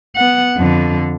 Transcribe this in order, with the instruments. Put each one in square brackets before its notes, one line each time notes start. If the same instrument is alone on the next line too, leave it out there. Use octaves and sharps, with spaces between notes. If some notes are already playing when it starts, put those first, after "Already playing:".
[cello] B3 F#5
F2 D3